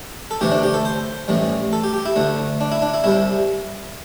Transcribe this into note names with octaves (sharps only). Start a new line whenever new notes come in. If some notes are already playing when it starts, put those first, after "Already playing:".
A4
D2 C3 E3 A3 G4
D4
G4
A4
C5
A1 A2 E3 G3
A4
G4
G4
E4
D2 D3 A3
D4
E4
D4
E4
C2 C3 G3 E4